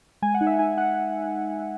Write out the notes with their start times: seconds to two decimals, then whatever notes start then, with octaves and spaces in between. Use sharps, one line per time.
0.22 G#3 G#5
0.34 F#5
0.41 D#4
0.47 E5
0.59 D#4 G#5
0.77 D#4 F#5